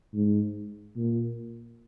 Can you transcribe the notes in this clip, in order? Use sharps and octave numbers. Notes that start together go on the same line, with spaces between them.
G#2
A#2